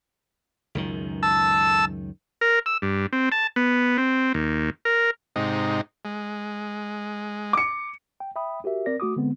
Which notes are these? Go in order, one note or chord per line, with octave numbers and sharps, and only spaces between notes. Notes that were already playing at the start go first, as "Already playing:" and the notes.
C#2 F#2 D#3
A5 E6
A#4
E6
G2
C4
A5
B3
C4
D#2
A#4
G#2 C3 D#4
G#3
D6 C#7
G5
E5 G5 B5 D#6
F#4 G4 A#4 E5
C4 A#4 D5 A#6
A3 F#4 D6 D#6
D3 G#3 B3 C4